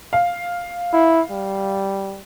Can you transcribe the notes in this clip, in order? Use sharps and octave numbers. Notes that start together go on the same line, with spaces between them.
F5
E4
G3